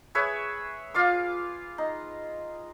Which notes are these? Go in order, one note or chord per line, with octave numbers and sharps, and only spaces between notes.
G#4 B4 C#5 E5
F4 F5 D6
D#4